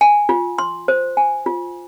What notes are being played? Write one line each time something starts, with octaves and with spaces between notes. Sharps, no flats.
G#5
F4
C6
C5
G#5
F4